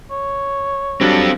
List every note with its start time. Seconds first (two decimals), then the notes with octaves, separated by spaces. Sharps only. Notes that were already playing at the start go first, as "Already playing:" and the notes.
0.11 C#5
1.01 F#3 G3 C4 D4 A4